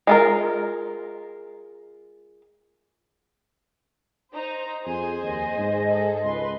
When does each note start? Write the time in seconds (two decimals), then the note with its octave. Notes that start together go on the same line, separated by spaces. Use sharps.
0.07 G#3 F4 A#4
4.33 D#4 C5 A#5
4.87 F2 G#4 C5 G#5
5.22 D#2 D#5
5.58 G#2
5.90 G#4 A4
6.24 C#2 B4 C6